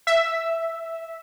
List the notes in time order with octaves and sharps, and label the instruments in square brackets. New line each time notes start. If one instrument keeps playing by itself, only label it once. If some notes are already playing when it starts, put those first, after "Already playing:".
[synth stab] E5